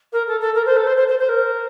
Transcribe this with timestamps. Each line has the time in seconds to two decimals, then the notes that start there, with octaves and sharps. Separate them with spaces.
0.12 A#4
0.27 A4
0.40 A4
0.54 A#4
0.66 C5
0.76 A4
0.87 C5
0.97 C5
1.08 C5
1.19 C5
1.29 A#4